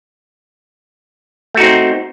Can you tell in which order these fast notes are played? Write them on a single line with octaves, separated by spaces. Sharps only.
A3 F#4 D#4 C4